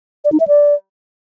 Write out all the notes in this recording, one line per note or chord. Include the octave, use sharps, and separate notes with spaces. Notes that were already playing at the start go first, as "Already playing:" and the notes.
D5
D#4
E5
D5